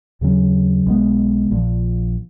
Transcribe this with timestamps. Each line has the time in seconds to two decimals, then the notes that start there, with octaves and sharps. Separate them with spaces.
0.21 D#2 C#3 F#3 C#4
0.86 B1 B2 G#3 B3
1.51 A#1 A#2 F3